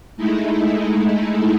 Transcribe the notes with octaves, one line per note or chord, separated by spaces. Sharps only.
G#3 A3 D#4 E4